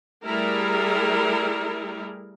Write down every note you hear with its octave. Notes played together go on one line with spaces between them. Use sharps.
G3 A3 E4 G#4 A#4